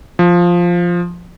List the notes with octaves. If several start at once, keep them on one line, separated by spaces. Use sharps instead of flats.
F3